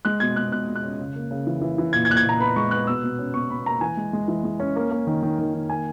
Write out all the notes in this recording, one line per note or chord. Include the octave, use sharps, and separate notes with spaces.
G#3 F#6
B2 G#6
B2 F#6
B2 F#6
B2
F#6
C#4
C#3
A#3
C#3
E3
E3
E3
A#2 G#6
G#6
A#2 F#6
G#6
A#2 A#5
B3 B5
G#3 C#6
B3 F#6
B2 E6
B2
C#4
B2 C#6
B2 B5
A#3 A#5
E3 G#5
G#3
G#3
E3
G#3
C#4
A#3
A#3
D#3
D#3
D#3
D#3
A#3 G#5